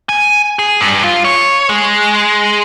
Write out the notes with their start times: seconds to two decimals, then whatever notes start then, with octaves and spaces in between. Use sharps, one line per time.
0.09 G#5
0.59 G#4
0.81 G2
1.04 F4
1.25 C#5
1.69 G#3